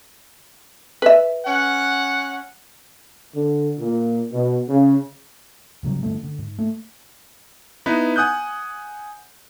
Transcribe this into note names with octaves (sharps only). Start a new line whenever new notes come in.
B4 E5
C#4 F#5
D3
A#2
B2
C#3
G#2 C#3 F#3 G3
G2 D3 G3 A3
D3
G#2
A3
B3 D#4 E4 B4
F#5 G#5 D#6 F#6 G6